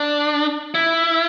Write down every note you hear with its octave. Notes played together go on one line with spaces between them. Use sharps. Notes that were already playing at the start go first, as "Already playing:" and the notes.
Already playing: D4
E4